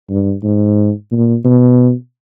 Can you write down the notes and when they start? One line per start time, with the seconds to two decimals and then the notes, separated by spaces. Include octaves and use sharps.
0.10 G2
0.43 G#2
1.12 A#2
1.45 B2